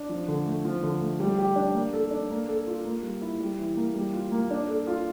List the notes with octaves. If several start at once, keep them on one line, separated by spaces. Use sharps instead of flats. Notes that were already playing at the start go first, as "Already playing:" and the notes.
Already playing: D4
F3
D3
A3
F3
D3
A3
G3
G4
D4
A#3
A4
D4
A#3
A4
F4
A#3
G3
E4
G3
E3
A#3
G3
F4
A#3
D4
A4
F4